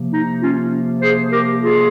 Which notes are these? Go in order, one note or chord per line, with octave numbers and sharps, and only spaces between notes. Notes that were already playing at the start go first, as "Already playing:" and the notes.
Already playing: C3 F3 A#3
D#4
C#4 F4
G#4 C5
G4 A#4
F4 G#4